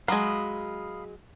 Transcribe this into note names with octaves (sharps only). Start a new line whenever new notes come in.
F#3 G#3 F5 B5 D#6